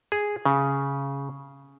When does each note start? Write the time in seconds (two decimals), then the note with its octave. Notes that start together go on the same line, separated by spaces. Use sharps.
0.12 G#4
0.45 C#3